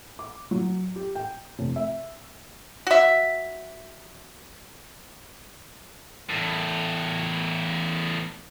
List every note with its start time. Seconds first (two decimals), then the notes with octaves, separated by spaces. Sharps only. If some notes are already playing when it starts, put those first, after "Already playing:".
0.19 D6
0.51 F#3
0.96 G4
1.15 G5
1.59 F1
1.76 E5
2.87 F#4 E5
6.30 E2 A2